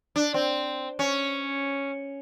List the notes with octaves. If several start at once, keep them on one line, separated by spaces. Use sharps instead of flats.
D4
C4
C#4